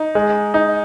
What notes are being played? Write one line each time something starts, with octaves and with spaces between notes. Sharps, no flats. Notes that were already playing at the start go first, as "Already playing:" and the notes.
Already playing: D#4
G#3
D#4